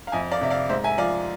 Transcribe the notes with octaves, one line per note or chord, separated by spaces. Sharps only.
F5
F2 E5 G#5
D5 F5
C3 E5
D5 F5
G#2 C5 E5
E5 G#5
F3 D5 F5